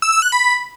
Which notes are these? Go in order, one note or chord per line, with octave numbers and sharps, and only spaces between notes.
E6
E6
F#6
B5